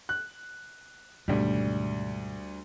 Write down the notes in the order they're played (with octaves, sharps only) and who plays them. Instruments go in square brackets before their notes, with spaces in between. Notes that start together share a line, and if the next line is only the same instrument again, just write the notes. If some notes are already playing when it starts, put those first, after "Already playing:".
[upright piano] F#6
[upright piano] D2 G3 [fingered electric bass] G#2 B2 D#3